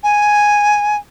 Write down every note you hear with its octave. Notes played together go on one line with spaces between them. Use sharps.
G#5